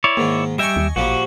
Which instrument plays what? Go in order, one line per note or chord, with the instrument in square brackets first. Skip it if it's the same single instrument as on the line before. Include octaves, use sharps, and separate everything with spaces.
[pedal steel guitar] E4 C#5 D5
[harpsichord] G#2 D#3 [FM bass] A#3
[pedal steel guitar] G3 E5 G5 [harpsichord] D#5 G#5 C#6
[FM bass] D#2
[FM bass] A1 [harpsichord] A#2 F3 G3 [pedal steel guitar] F#4